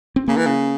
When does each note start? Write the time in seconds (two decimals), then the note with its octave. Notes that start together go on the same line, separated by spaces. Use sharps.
0.16 C4
0.28 C#3 A#3
0.37 E3
0.46 C#3